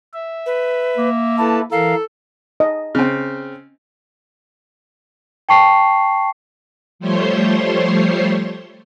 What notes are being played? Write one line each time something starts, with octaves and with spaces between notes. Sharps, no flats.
E5
B4
A#3
E4 A4 B4 A5
E3 A4 A#4 F5
D#5
C#3 C4
G5 A5 C#6 C7
F3 G3 A3 C5 C#5 C6